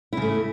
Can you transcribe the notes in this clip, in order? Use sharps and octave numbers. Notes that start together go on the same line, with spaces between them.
C#3 A3 E4